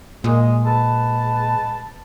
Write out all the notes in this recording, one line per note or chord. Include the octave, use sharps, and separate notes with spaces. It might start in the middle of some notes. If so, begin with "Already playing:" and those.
A#2 G#3
G#3 B4 A5